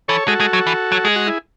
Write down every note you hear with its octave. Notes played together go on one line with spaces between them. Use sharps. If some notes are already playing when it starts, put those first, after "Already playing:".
E3 A4 C#5
G#3 F#4 A4
G#3
F#3
E3
F#3
G#3 G#4
F#4
E4 G#4